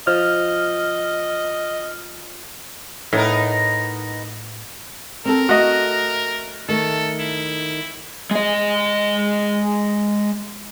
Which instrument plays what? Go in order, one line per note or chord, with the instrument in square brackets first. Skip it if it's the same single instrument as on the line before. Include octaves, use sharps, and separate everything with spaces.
[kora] F3 [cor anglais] D#5 [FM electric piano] F6
[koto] A2 [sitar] B3 D#4 A#4
[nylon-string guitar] C4 A4 [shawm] A#4
[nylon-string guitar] A3 [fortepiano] F#4 D#5
[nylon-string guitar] D#3 A3 [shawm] A4
[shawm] E4
[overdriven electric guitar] G#3 D#5